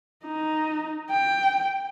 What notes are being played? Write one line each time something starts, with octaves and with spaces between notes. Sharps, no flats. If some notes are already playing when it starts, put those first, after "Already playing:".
D#4
G5